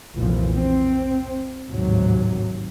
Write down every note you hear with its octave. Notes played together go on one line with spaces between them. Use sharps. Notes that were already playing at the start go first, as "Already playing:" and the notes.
F1 B1 A#2 E3 F3
C4
A1 D#2 G#2 C3 F#3